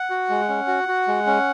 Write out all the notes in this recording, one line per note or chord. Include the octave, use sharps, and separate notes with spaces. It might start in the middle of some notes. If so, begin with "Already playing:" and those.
Already playing: F#5
F#4
G#3
C#4
F#4
F#4
G#3
C#4